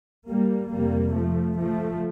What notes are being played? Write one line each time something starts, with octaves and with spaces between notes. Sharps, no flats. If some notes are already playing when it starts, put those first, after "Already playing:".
G3 A#3
F2 C3 G3 A#3
F3 A3
F3 A3